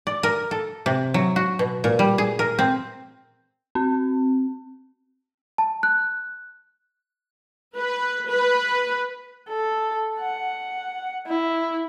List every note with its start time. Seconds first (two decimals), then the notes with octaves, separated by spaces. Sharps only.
0.07 D5
0.23 A#4
0.51 A4
0.86 C3
1.14 F#3
1.36 F#4
1.59 B2
1.84 A#2
1.99 G3
2.18 G#4
2.39 A#4
2.59 C4
3.75 C4
5.58 A5
5.83 F#6
7.76 B4
8.28 B4
9.49 A4
10.20 F#5
11.27 E4